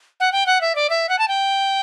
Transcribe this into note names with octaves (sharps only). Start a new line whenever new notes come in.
F#5
G5
F#5
E5
D5
E5
F#5
A5
G5